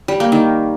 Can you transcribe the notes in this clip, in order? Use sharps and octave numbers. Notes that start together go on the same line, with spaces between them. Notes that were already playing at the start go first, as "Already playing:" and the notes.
G3
A#3
D#3